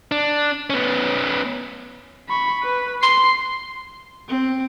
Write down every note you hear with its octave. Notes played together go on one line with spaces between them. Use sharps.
D4
B3 C#4
B5 C#6
B4
C6 C7
C4